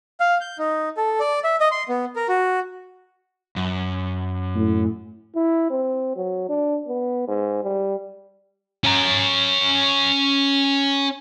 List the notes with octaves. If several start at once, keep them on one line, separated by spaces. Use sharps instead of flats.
F5
G6
D#4
A4
D5
E5
D#5
C6
B3
A#4
F#4
F#2
A2
E4
C4
F#3
D4
B3
G#2
G3
C#4 A#5